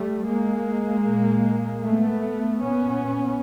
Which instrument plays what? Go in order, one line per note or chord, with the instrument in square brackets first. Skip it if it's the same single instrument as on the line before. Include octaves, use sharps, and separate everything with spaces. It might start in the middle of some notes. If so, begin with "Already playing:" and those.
Already playing: [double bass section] G3 A3
G#3 A#3
A#2
A3 B3
A#2 B3 C#4